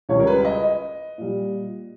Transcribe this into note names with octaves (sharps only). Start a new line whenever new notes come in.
C#2 C#3 G3 C#5
A#4
B4
D#5
D#5
A#2 G3